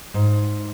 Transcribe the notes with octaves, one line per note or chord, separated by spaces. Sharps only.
G#2